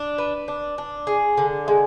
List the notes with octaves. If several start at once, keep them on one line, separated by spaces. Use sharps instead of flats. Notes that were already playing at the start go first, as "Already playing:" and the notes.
Already playing: D4
B4
D4
D4
G#4
D3
G#3